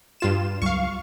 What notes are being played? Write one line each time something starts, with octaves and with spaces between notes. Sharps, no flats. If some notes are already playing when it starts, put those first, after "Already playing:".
G2 F4 E7
C#2 F#3 G3 F5 C#6